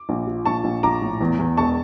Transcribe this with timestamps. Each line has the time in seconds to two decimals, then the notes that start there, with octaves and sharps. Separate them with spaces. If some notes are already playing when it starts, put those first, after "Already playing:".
Already playing: D6
0.09 A#1
0.27 F3
0.46 A#1 A5 C#6
0.64 A#1
0.83 A#1 A#5 D6
1.02 A2
1.21 E2
1.39 E2
1.57 E1 A5 C#6